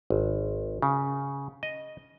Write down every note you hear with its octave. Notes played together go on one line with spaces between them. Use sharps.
G#1
C#3
D#5